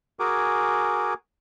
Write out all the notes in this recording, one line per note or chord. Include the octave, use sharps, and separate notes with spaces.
F#4 G#4 A#4 G#5 D6